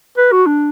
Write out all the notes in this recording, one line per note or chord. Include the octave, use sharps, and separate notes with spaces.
B4
F#4
D4